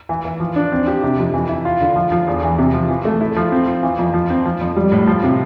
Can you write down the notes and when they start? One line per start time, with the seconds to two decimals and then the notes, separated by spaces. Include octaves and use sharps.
0.09 E3
0.25 E3
0.40 F3
0.56 D4
0.72 C4
0.87 G4
1.03 C3
1.18 F2
1.34 E3
1.49 E4
1.65 F4
1.81 D3
1.96 F3
2.12 F3
2.27 E2
2.43 E3
2.58 C3
2.74 F3
2.89 E3
3.05 A3
3.21 E4
3.36 F3
3.52 C4
3.68 F4
3.83 E3
3.99 F2
4.14 F3
4.30 C4
4.45 F3
4.61 F2
4.76 G3
4.92 A2
5.07 F3
5.24 C3